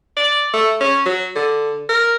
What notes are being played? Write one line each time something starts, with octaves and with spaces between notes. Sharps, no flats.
D5
A3
C#4
F#3
D3
A#4